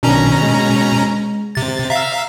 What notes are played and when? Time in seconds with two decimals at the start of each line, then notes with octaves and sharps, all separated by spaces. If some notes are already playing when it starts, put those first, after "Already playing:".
0.03 B1 B2 D#3 C#4 D4 A#5
0.42 G#3
1.55 C3 A6
1.90 E5 F5 A#5